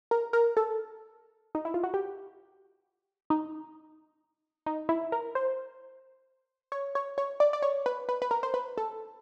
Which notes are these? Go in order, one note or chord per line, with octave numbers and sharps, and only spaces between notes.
A#4
A#4
A4
D#4
E4
F4
F#4
G4
D#4
D#4
E4
A#4
C5
C#5
C#5
C#5
D5
D5
C#5
B4
B4
B4
A#4
C5
B4
A4